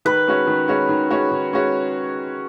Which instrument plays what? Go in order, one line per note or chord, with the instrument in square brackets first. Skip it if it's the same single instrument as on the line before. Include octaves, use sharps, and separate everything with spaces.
[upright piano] D#3 [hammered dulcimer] B4
[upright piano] G#3 C#4 F#4 C#5
D#3
G#3 C#4 F#4 C#5
D#3
G#3 C#4 F#4 C#5
D#3
G#3 C#4 F#4 C#5